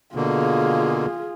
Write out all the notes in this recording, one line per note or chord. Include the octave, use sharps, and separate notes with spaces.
B2 D3 A#3 F4 G#4